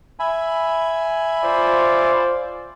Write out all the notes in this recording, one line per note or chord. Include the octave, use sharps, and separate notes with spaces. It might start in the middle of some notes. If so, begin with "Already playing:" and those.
E5 G#5 B5
F4 C5 D5